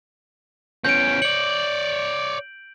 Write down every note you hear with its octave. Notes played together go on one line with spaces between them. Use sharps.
E2 C#4 G6 D7
C#5 D5 F#7